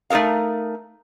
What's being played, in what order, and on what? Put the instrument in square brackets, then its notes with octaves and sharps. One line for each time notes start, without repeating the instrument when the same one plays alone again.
[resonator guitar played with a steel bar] A3 D#4 A4 A#4 F5